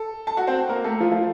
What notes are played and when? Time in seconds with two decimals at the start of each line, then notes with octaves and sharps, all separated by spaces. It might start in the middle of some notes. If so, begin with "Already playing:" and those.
Already playing: A4
0.27 A5
0.37 F#4 F#5
0.47 C4 C5
0.68 A#3 A#4
0.84 A3 A4
1.00 F3 F4
1.11 F3 F4